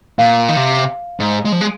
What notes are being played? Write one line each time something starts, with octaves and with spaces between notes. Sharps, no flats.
A#2 F5
D#3
C3
G#2
G#3
F3
G#3